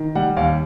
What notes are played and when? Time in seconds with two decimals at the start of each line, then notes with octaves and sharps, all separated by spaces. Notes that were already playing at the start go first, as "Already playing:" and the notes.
Already playing: D#3
0.15 G3 F#5
0.37 D#2 F5